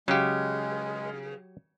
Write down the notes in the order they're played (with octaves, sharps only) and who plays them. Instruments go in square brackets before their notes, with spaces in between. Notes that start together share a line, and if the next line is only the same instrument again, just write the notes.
[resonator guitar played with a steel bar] C#3 [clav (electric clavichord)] F#3 G4 [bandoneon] G#3